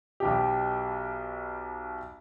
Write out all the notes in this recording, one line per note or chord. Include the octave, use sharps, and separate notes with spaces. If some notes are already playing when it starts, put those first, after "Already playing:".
B1 B2 G4